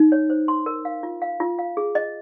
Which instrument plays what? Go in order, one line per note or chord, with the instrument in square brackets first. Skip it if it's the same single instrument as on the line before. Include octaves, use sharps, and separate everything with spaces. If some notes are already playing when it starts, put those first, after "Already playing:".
Already playing: [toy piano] D#4
C#5
C5
C6
A#4
F5
F4
F5
F4
F5
G#4
D#5